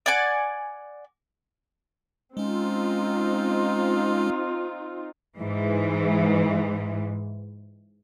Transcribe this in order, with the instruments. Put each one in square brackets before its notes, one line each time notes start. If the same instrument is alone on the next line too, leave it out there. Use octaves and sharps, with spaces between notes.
[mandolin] D5 F#5 G#5 D6
[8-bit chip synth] G#3 C#4 [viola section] C4 D#4 F4
[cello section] G#2 E3